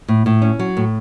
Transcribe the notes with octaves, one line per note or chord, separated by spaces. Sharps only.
A2
A2
C#4
F#3
A2